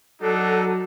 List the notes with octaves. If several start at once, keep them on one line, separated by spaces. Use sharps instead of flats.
F#3 D4 D#4 F#4 A4 F#5